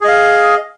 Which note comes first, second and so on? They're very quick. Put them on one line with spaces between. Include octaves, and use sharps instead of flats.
G#4 D#5 F5